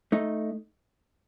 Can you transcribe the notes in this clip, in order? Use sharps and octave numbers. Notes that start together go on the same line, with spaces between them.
A3 D#4